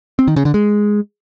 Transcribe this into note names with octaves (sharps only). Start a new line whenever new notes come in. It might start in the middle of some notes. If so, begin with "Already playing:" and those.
C4
D#3
C#3
D3
G#3